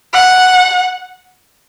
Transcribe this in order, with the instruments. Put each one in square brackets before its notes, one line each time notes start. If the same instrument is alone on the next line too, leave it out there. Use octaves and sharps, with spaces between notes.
[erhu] F#5